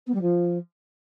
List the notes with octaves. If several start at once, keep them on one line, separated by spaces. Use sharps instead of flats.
B3
G3
F3